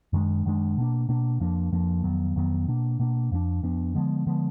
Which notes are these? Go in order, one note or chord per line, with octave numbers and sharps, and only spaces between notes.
F#2 D#3 G#3 D4
F#2 D#3 G#3 D4
B2 A#3 D4
B2 A#3 D4
F2 F3 A#3 D4
F2 F3 A#3 D4
F2 D#3 F#3 B3
F2 D#3 F#3 B3
B2 A#3 D4
B2 A#3 D4
F2 F3 B3 D4
F2 F3 B3 D4
D3 F3 G#3 B3
D3 F3 G#3 B3